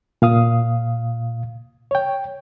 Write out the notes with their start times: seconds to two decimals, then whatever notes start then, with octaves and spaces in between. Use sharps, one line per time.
0.22 A#2 F5 D#6
1.91 C#5 G5